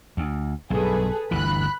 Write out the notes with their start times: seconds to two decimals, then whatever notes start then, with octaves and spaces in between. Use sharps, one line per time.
0.17 D2
0.70 B1 G2 G#4 A4 B4
1.31 G1 D2 E3 B5 F#6